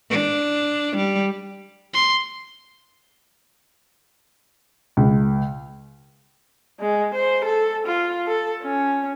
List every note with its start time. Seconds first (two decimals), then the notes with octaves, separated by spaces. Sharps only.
0.11 D4
0.96 G3
1.94 C6
4.97 C#2
6.80 G#3
7.15 C5
7.45 A4
7.87 F4
8.27 A4
8.63 C#4